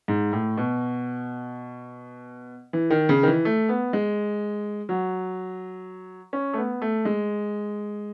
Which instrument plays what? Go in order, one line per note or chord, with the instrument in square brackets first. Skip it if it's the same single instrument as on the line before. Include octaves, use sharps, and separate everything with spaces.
[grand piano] G#2
A2
B2
E3
D#3
C#3
D#3
E3
A3
B3
G#3
F#3
C#4
A3
B3
A3
G#3